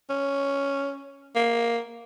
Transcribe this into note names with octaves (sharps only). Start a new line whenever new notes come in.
C#4
A#3